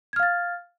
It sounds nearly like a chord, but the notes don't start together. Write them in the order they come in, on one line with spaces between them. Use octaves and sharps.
G#6 F6 F5 A6